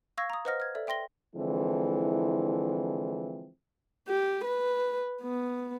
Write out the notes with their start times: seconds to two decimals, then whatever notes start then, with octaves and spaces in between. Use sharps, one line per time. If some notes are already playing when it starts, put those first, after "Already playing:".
0.17 F5 C#6 E6 G#6 A#6
0.30 A#5 D#6
0.45 B4 C5 D#5 F#5 F6 A#6
0.60 F6 G#6
0.75 A4 D5 E5
0.87 E5 G5 C6 A#6 G7
1.35 D3 E3 F3 G#3 C4 E4
4.08 G4
4.44 B4
5.22 B3